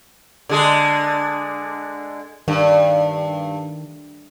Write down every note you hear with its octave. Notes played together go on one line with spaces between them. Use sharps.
D3 G#3 G#4
G2 D#3 G3 A3 D4